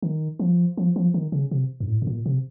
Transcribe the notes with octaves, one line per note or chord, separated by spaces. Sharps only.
D#3
F3
F3
F3
D#3
C#3
C3
F#2
A2
A2
A#2
C3